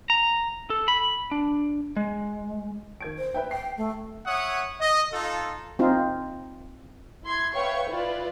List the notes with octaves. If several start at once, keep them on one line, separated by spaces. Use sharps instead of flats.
A#5
A4
B5
D4
G#3
D#3 G#6 D7
C5
B4 E5 G5
G5 C7
A3
C#5 E5 F#5 C#6 D#6
D#5
D#4 F4 A4
C4 D#4 F4
E4 C6 G#6
B4 C#5 E5 F5 G5 C#6
E4 F4 B4 D5